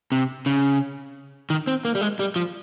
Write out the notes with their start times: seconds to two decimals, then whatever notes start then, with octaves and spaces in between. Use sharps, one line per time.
0.12 C3
0.46 C#3
1.50 D#3
1.67 C4
1.85 A#3
1.95 G3
2.01 G#3
2.19 G3
2.36 F3